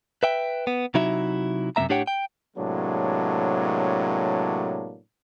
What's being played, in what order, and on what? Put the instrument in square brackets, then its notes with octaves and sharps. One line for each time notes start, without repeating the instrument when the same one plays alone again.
[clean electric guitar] B4 E5 G5
B3
C3 F#3 D#4 E4 F#4 E5
F#2 C3 A#3 B3 E5 A#5
A2 D4 G4 C#5 F#5 G5
G5
[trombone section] A2 C3 F#3 G#3 A#3 D4